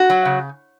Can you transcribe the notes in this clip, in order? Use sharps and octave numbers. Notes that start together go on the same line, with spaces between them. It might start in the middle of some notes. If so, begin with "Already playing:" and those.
Already playing: F#4
F#3
C#3